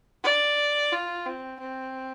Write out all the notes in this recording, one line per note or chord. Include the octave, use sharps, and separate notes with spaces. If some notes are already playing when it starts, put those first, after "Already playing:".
D5
F4
C4
C4